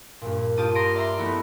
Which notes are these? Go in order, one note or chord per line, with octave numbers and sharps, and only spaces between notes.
G2 A#2
F4 G4 A5 D#6
A#5 C6 A#6 D7
D5 E5 A#5 C6
A3 B3 E4 D#5